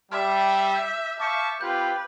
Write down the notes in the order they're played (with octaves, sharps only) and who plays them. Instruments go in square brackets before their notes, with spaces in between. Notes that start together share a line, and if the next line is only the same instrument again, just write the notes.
[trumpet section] G3 [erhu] E5 [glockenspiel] D6 F6
[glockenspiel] G6
[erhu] E5 [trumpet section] F5 A5 C#6 [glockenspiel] D6 G6
[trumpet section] C4 F4 G4 [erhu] B4 [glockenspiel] G6